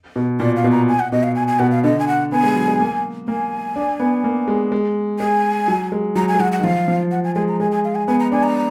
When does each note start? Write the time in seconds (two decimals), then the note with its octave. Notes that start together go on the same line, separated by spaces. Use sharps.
0.16 B2
0.40 A#2 D5
0.56 F5
0.64 B2
0.72 A#5
0.88 G#5
1.00 F#5
1.12 B2 D#5
1.23 F5
1.35 G#5
1.48 G#5
1.59 B2 F#5
1.71 F5
1.84 D3 D#5
1.99 G#5
2.08 F#5
2.32 B3 G#5
2.43 G#3
2.56 F#3
2.68 G#3
2.80 A#3
3.28 A#3 G#5
3.76 D4
4.00 B3
4.24 A#3
4.48 G#3
4.72 G#3
5.19 G#3 G#5
5.68 F#3
5.92 G#3
6.16 F#3 A#5
6.28 G#5
6.35 G#3
6.40 F#3 F#5
6.52 F#5
6.59 D#3
6.64 F3 F5
6.88 F3
7.11 F#5
7.24 G#5
7.35 G#3 G#5
7.48 A#5
7.60 G#3 G#5
7.72 G#5
7.84 F5
7.95 G#5
8.08 B3 G#5
8.20 A#5
8.32 D4 G#5
8.43 A#5